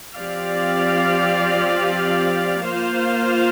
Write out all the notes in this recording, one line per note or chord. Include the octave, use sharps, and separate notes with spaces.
F3 C4 G4 D5 F5
A#3 F4 C5 F5